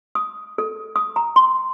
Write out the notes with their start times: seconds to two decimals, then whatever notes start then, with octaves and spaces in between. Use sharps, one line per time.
0.15 D#6
0.58 A4
0.96 D#6
1.16 A#5
1.36 C6